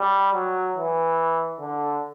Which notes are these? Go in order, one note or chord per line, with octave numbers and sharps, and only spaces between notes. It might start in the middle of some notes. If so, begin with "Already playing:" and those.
Already playing: G3
F#3
E3
D3